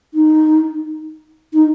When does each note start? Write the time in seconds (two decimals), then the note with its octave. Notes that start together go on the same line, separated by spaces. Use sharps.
0.14 D#4
1.53 D#4